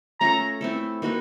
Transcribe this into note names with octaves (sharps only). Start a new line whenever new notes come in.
A3 C#4 F4 A4 A#5
A3 C4 E4 A4
A#3 D#4 F#4 B4